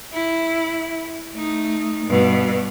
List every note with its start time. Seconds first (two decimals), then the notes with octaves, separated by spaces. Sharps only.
0.13 E4
1.35 A3 D#4
2.06 G2 B2